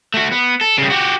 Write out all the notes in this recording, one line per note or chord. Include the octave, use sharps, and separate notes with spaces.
A3 F#4
B3
A4
C#3 G3
F#4 G4